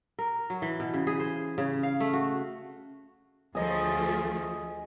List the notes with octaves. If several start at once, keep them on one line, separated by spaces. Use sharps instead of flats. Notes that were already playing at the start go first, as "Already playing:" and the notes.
A#4
F#3
E3
B2
C#3
G#4
C5
C#3
F5
A3
F#4
D2 F3 A3 G#4 D#5